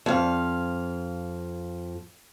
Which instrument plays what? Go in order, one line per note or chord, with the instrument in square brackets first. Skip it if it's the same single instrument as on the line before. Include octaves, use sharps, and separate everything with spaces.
[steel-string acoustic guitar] F2 F5